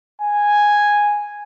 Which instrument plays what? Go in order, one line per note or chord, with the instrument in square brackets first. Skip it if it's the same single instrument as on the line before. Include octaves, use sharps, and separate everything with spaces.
[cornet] G#5